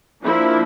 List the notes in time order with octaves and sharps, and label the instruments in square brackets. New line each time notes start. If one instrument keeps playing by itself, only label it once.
[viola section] F3 A#3 D4 E4